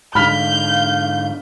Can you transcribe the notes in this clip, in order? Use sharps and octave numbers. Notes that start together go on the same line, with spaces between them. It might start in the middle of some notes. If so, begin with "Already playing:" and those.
G#2 D3 F5 B5 F6 G6 B6